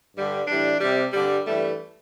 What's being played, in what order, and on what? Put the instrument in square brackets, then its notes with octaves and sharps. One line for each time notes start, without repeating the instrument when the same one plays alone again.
[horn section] G2 D3 G3
A2 E3 G3 D4
C3 G3
G2 D3 G3
G2 E3 G3 A3